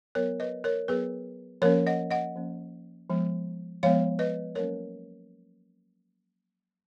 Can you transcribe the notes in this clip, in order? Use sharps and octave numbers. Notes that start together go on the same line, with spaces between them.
F#3 B3 A#4 C#5
B4 D#5
A#4 C#5
F#3 B3 G#4 B4
F3 A#3 C#4 A#4 C#5
D#5 F#5
D#5 F#5
F3 A#3 C#4
F3 G#3 B3
F3 G#3 B3 C#5 F5
B4 D#5
F#3 A#3 C#4 A#4 C#5